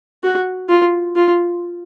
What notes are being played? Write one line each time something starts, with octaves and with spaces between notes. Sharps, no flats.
F#4
F4
F4